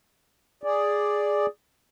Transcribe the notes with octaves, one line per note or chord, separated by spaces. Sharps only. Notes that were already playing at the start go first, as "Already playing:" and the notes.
G#4 D5